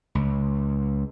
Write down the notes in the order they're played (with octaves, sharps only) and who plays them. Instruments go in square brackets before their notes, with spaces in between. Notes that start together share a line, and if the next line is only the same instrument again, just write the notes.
[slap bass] C#2